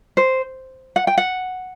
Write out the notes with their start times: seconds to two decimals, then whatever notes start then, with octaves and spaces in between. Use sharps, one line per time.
0.17 C5
0.96 F#5
1.07 G5
1.18 F#5